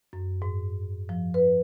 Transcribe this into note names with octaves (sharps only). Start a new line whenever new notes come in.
F#2
G#2
F3
B4